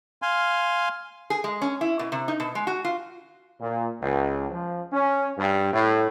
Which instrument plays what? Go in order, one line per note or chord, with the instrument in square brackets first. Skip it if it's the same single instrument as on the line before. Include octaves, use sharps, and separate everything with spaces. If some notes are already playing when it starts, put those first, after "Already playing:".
[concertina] F5 G#5 C6
[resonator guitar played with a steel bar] G#4
G#3
C#4
E4
B2
C3
D#4
B2
G#3
F#4
F4
[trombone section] A#2
C#2
F3
C#4
G2
A2